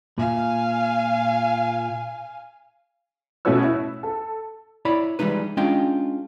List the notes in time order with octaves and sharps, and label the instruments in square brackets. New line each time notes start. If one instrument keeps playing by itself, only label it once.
[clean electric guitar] A#2 [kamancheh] F5 G#5
[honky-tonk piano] B2 A3 C#4 F#4 C#5 E6
E4
A4
[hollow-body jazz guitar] E4 C#5 D5 B5
E3 F3 G3 G#3 D#4 B4
G#3 C#4 D4 F4 D#5 G5